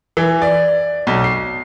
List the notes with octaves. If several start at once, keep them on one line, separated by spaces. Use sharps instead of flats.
E3
D5
B1
C7